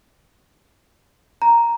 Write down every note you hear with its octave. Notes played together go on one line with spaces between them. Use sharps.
A#5